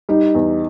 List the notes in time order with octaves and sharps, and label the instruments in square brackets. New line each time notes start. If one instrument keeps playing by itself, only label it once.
[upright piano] G3 [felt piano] D#4
[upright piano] E2